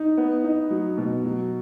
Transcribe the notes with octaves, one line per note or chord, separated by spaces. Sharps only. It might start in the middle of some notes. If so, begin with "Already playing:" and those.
Already playing: D#4
B3
D#4
F#3
B2
F#3